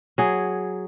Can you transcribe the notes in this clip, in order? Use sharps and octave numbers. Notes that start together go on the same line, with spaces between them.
F#3 G#4